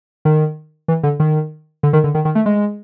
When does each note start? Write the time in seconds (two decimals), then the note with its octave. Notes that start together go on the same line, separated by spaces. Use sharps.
0.25 D#3
0.88 E3
1.03 D3
1.20 D#3
1.83 D3
1.93 D#3
2.04 D3
2.15 D#3
2.25 D#3
2.35 A3
2.46 G#3